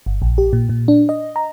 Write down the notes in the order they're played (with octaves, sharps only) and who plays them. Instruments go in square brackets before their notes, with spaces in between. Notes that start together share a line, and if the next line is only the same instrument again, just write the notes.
[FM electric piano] G1
A#1
G4
A#2
A#2
D4
D#5
A#5